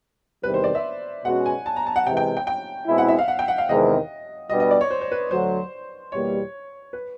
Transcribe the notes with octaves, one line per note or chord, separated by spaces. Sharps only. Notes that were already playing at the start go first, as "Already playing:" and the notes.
E2 C3 D#3 G3 C4 B4
C5
D5
E5
B2 G#3 C#4 F#4 F#5
G#5
A5
A#5
A5
F#5
C3 E3 G#3 G5
G5
G5
G5
B2 G#3 C4 E4
F#5
E5
F5
F#5
G5
F#5
F5
E2 C3 D#3 G#3 C4 D#5
B2 G3 B3 D4 D#5
D#5
D5
C#5
C5
C5
B4
D2 D3 F#3 C5
E2 B2 G3 A#3 C#5
B4